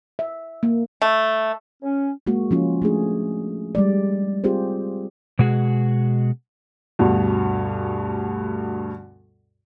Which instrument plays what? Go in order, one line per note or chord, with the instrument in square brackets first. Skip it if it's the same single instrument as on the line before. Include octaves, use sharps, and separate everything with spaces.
[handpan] E5
A#3
[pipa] A3
[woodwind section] C#4
[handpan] G#3 A#3 F#4
F3 C#4 F4
A3 D4 G#4
G3 G#3 D5
C4 F4 G4 G#4 C5
[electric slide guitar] B2 G#3 F#4 G#4
[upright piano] D2 G2 B2